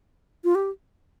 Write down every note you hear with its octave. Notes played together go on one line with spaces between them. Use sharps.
F4
G4